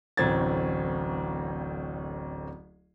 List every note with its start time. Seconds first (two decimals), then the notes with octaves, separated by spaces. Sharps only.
0.17 D1 A1 C4 G#6 A6